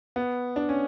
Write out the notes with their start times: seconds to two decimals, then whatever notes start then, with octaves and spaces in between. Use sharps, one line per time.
0.16 B3
0.56 D4
0.69 C#4